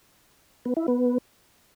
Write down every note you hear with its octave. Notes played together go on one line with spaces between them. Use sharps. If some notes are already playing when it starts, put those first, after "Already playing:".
B3
E4
B3